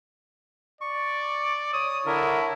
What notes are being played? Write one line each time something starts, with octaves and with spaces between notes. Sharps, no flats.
D5 C#6
C#5 D#6
D3 D4 E4 A#4